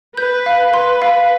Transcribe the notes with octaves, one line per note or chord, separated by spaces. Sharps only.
B4 G6
F5
B4 C6
F5